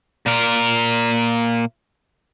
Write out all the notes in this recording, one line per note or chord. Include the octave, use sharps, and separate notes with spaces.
A#2 A#4